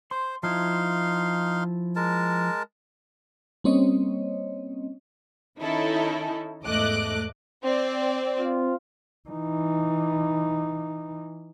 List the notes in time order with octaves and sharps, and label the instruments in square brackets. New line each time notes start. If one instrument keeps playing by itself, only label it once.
[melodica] C5 [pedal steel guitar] C6
[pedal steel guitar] F3 E4 [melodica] D#4 F5 C6
[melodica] G#3 A#4 A5
[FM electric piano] G3 A#3 C4 C#4 C#5 D#5
[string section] D#3 C#4 D#4 E4 A4
E2 G#2 A3 D#5 D6 F#6
[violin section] C4 D5
[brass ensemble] C4 F4
[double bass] E3 D#4